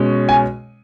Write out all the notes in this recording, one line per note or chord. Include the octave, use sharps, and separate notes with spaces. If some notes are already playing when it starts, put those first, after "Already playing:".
Already playing: B2 G#3 C#4
G#5